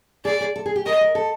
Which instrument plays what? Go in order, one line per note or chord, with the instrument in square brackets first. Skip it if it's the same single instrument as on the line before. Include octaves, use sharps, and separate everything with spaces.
[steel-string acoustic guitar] G#4 [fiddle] D5
[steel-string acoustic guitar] G#4
A4
G#4
G4
[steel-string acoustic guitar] A#4 [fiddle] D#5
[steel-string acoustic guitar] A#4
A4